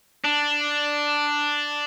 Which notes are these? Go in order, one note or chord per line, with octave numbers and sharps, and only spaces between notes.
D4